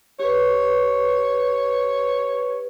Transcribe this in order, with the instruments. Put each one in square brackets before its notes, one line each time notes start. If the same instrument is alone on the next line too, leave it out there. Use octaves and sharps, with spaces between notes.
[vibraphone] G4 B4 [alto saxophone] C#5